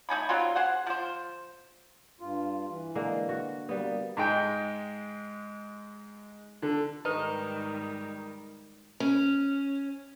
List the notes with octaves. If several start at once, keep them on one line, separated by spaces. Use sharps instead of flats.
A3 D#4 G#5 B5
F#3 G3 C4 F4
G#4 C5 F#5
F3 C5
G2 F4
E3
D3 G#3 A#3
F#4
G3 A#3 B3
G#2 G#3 G5
D3
G#2 D#3 G3 D#4 G4 B4
C#4